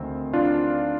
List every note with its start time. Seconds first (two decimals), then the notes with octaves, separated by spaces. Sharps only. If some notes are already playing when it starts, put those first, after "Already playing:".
Already playing: D2 D#3 C4
0.33 D4 F4